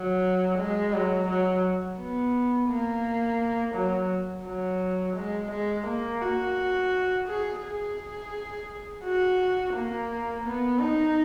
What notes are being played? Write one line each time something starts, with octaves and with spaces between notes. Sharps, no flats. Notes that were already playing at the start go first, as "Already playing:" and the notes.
Already playing: F#3
G#3
F#3
F#3
B3
A#3
F#3
F#3
G#3
G#3
A#3
F#4
G#4
G#4
F#4
A#3
B3
D#4